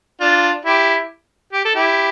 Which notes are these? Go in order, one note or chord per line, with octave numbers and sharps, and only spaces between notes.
D4 F4
E4 G4
G4
A4
E4 G4